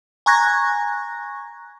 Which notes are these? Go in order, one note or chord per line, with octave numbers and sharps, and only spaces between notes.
G#5 A#5 C#6 F#6 G#6 A#6